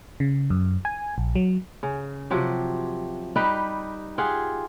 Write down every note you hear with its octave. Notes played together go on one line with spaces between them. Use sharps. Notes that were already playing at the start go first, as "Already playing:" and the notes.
C#3
F#2
G#5
A#1
F#3
C#3
C3 F3 F#3 G4
G3 D#4 G4 B4
F4 G4 G#4 F#5